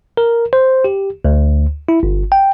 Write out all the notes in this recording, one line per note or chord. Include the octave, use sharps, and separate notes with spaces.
A#4
C5
G4
D2
E4
G1
G5